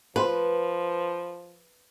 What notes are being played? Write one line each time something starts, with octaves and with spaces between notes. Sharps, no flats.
F3 F4 B4 C5